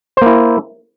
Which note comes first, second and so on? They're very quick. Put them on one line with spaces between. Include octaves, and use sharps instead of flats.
C5 A#3 E4